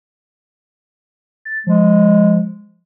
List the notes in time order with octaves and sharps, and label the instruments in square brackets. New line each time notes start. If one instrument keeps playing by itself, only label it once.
[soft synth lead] A6
[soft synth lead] F3 [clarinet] G#3